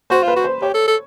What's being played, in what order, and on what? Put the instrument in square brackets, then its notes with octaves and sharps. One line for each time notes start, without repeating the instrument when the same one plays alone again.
[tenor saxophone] F#4 [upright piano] C5
[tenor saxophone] F4
[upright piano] B4
[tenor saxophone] F#4
[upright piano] C5
[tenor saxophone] G4 [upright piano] C#5
[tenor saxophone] A4
A4